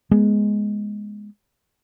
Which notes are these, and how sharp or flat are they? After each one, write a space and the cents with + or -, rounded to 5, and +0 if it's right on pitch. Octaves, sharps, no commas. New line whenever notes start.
G#3 +0 B3 -25